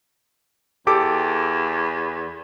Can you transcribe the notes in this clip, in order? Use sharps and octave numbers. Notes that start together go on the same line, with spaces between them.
E2 G4 A4 D6